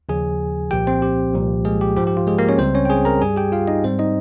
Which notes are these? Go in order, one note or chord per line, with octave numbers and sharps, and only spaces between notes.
D#2 C#3 F3 G#4 G#5
C2 A#2 F3 G4 G5
C4 C5
G4
C2 A#2 F3
G#3 G#4
G4
G#2 F3 G4
G4
F4
G#3 G#4
A#3 A#4
C#4 C#5
C#2 C#3 G3 C4 C5
C#4 C#5
G5
G#4 G#5
A#4 A#5
G2 G3 G#4 G#5
G4 G5
F4 F5
D#4 D#5
G#2 G3 C4 C5
D#4 D#5